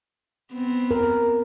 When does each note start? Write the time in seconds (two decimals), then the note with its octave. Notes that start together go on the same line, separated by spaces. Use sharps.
0.53 B3 C4
0.91 A#4